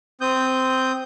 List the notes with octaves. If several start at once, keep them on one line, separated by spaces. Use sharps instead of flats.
C4 D#6 G6